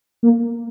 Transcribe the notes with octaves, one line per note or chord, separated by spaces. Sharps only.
A#3